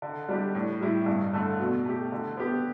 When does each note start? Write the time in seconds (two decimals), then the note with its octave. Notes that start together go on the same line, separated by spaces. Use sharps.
0.02 D3
0.29 G3 D4 G4
0.55 A2
0.81 G3 E4 G4
1.06 G2
1.33 D3 A3
1.59 B2
1.85 A3 G4
2.12 D3
2.37 B3 G4